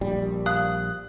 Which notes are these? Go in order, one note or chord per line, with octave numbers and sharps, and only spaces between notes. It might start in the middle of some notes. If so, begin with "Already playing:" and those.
A#1 G3
F5 D#6 F#6